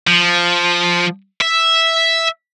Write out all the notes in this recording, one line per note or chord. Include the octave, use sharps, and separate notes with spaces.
F3
E5